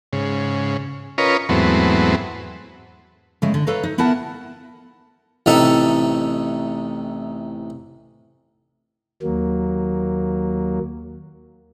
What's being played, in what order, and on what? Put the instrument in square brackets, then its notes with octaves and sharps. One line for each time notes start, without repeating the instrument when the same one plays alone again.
[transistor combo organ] G#2 C#3
C#4 F4 A#4 B4 C#5 D#5
E2 G#2 F#3 A3 B3 C4
[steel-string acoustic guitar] C#3 G#3 A3
D3
A4 B4 C#5 F5 A#5
D#4
B3 E4 A#4 F#5 A5
[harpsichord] A1 A2 C3 D#4 A4 E5
[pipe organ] D#2 F#3 A#3